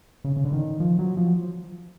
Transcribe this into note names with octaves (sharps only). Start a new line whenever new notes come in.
C#3
C#3
D3
D#3
F3
F#3
F3